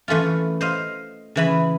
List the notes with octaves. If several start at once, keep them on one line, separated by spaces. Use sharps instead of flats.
E3 A3 C#4 F4
C5 D#5 F5
C#3 E3 B5